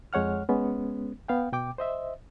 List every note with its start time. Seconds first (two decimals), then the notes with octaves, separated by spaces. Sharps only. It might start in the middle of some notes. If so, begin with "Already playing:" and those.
0.13 F2 G#3 C#5 F#5 F6
0.49 G#3 B3 C#4
1.28 B3 F5 G5
1.52 B2 G5 D6
1.78 C5 D#5 E5